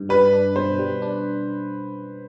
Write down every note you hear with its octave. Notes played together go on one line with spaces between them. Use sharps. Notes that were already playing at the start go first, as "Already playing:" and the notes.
Already playing: G2
G3 B4
D4
B2 C5
G3
D4